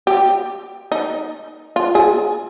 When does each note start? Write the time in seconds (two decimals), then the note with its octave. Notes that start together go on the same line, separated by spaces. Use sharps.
0.07 G4
0.92 D#4
1.76 F4
1.95 G#4